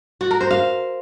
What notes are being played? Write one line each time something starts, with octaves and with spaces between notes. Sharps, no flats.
F#4
A#4
C5
F5